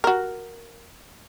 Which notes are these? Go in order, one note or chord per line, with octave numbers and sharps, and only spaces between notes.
F#4 A#4